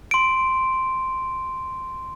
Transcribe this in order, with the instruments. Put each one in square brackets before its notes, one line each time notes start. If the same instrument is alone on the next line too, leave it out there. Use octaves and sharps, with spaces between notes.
[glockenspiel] C6 D7